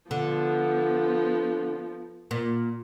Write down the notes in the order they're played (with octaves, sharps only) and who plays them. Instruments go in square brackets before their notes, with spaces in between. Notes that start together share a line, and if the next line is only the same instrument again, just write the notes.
[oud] D3 [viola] F3 B3
[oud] A#2